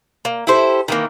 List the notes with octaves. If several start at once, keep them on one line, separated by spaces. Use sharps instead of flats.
A#3
E4 G4 A4 C5
D#3 E3 A#3